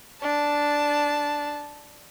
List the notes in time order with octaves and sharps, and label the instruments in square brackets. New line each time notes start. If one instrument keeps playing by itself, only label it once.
[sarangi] D4 [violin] A5